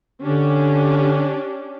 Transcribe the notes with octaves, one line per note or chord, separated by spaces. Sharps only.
D3 C#4 D4 G4